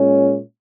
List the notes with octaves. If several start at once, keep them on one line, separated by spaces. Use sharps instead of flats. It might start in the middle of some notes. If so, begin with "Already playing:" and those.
Already playing: A#2 G#3 C#4